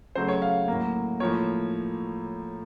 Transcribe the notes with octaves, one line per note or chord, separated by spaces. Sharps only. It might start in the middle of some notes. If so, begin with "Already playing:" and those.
C#3 F#3 A3 C5
C#5
F5
A2 F#3 A#3
A2 F3 A#3 C#5